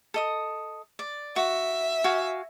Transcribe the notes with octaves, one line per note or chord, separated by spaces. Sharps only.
A4 D#5 D#6
D5
F#4 E5
F#4 F5 G#5